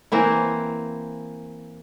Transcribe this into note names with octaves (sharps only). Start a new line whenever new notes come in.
E3 A#3 C4 E4